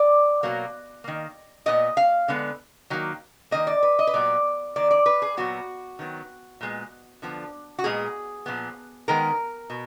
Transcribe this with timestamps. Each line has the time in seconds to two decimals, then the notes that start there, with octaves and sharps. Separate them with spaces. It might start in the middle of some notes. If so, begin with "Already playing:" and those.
Already playing: D5
0.43 B2 F#3 A#3
1.04 D#3 A#3
1.66 A#2 G#3 B3 D#5
1.97 F5
2.28 D3 G#3 B3
2.90 D#3 F#3 A#3
3.51 D#3 A#3 D#5
3.67 D5
3.83 B4
3.99 D#5
4.07 B4
4.14 A#2 F#3 B3 D5
4.76 D#3 A#3 D5
4.91 D5
5.06 B4
5.22 G#4
5.37 A#2 F#3 B3 F#4
5.99 D#3 F#3 B3
6.61 A#2 G#3 B3
7.22 D3 F3 B3
7.79 F#4
7.84 A#2 G#3 B3 G#4
8.46 A#2 F3 B3
9.08 D#3 G#3 B3 A#4
9.70 B2